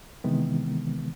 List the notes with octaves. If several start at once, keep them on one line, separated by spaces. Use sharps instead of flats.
C3 D#3 E3 G#3 B3